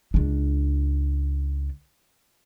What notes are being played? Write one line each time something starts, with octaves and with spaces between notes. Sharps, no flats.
C#2 D4